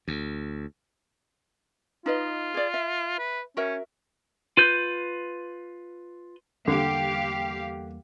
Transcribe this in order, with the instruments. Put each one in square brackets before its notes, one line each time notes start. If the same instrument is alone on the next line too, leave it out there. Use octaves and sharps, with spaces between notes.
[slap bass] D2
[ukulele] D#4 B4 D#5 [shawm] F4
[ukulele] G#4 D5
E5
[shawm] B4
[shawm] C#4 [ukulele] F#4 A#4 E5
[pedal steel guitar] F4 B4 G6
[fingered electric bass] E2 G3 A#3 [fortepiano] D3 [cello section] G4 F5